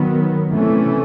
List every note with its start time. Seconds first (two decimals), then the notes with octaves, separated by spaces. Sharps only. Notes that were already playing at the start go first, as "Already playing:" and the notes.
Already playing: D#3 F#3 B3
0.50 C3 E3 A3 C#4